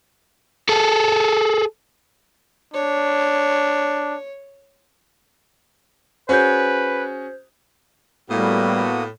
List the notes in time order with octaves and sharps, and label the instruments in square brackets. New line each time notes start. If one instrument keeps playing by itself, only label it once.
[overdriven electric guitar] G#4 A4
[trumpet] D4 [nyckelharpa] C#5
[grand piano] C#4 F#4 G#4 [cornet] B4 [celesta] C5 G6
[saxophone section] A2 [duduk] G3 [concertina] A#3 D#6 [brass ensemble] B3 F#4